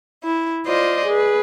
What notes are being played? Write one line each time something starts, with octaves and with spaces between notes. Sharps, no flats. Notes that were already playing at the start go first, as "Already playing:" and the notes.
E4
F4 C5 D5 D#5
G#4 B4